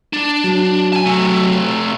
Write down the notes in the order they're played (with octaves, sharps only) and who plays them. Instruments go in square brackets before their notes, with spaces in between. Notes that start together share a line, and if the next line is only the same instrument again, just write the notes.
[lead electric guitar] D4 [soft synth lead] A6
[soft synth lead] F#3
[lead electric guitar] G#5 A5
C3 A3